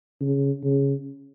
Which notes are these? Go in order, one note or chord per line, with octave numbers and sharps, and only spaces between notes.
C#3
C#3